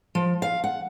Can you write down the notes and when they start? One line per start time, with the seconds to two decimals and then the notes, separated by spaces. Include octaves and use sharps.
0.15 F3
0.42 F5
0.64 F#5